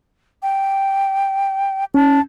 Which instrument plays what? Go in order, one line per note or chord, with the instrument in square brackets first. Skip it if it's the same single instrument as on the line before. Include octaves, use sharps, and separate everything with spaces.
[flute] G5
[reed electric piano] C#4 [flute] A5